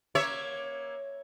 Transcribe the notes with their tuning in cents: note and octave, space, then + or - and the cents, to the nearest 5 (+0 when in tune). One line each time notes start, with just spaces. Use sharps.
A#3 +20 C#5 +0 E5 +0